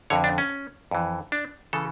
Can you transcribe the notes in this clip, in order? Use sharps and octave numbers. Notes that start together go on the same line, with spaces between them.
F2 D3 C#5
D4
C#4
F2 E3
D4
C#3 E3 A4